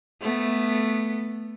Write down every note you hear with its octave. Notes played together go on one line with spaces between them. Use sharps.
A3 B3